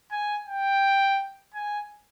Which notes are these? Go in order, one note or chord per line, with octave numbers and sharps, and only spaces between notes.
G#5
G5
G#5